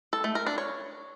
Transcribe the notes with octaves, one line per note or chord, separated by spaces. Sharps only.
A4
A3
A#4
D4
C#5